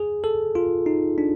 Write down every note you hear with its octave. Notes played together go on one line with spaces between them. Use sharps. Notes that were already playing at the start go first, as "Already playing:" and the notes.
Already playing: G#4
A4
F4
D#4
D4